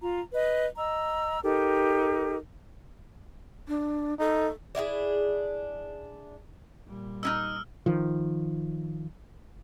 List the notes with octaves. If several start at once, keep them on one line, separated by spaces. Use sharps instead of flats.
F4 A#5
B4 D#5
D#5 A#5 E6
D#4 G4 A4 A#4
D4
D#4 A4
D4 E4 F#4 G#4
A#2 G3
D#4 E4 D#5 E6 F6
D#3 F3